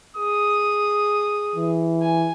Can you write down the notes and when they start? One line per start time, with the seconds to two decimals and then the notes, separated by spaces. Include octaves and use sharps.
0.17 G#4 D#6
1.56 E3
2.01 G#5